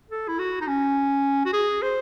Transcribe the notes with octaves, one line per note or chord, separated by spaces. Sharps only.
A4
E4
F#4
D#4
C#4
F#4
G#4
C5